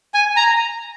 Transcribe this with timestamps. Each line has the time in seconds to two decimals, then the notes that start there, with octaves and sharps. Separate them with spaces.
0.14 G#5
0.36 A#5